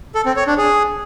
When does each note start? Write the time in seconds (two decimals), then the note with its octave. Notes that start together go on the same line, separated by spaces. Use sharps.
0.15 A4
0.26 C4
0.36 C#5
0.47 D4
0.58 G#4